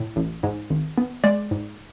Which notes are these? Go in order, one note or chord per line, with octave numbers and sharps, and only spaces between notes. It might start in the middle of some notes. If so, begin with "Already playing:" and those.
Already playing: A2
A1
G#2
G#1
B3
G#3 D5
G#2